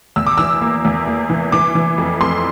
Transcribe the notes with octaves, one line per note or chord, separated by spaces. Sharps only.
E2 E6
D6
E3 E6
A#3
E2
A#3
E3
E3 D6
E3
F2
F2 C6